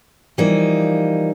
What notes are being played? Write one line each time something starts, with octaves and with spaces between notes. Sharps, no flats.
E3 F3 G3 A#3 D#4